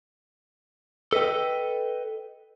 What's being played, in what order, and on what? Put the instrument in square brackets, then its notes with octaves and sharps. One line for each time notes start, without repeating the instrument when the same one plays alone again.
[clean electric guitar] A4 B4 D#5 G5